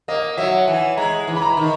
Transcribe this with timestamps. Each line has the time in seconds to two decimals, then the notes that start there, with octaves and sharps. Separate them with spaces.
0.08 A#3 D#5
0.37 F#3 E5
0.58 F#5
0.68 E3 G#5
0.97 G#3 A#5
1.27 E3
1.36 B5
1.42 A#5
1.57 D#3